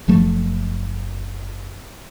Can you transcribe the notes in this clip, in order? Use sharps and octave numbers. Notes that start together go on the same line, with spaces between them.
F#1 F3 A3